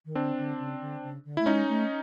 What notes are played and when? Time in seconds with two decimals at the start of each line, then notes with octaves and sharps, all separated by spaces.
0.05 D#3
0.15 D3 C4 D4
0.38 D3
0.59 C#3
0.81 D3
1.03 C#3
1.25 D3
1.37 A3 E4
1.46 G#3 C#4 D#4
1.68 A3